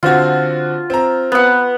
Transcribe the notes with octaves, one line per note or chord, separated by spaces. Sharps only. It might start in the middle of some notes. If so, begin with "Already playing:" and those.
D3 C4 F4 F#4
C4 A#5
B3 F#5